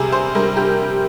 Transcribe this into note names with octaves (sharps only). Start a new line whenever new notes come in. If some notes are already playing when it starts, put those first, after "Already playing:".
Already playing: C3 G3 G#4
C5
G3 A#4
G4